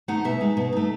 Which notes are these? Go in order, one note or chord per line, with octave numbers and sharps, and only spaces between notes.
A3 D#4 F#5
B2 E5
G#3 D#4
B2
A3 D#4